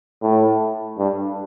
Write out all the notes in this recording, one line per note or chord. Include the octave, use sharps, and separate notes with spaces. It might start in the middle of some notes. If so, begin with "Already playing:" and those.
A2
G2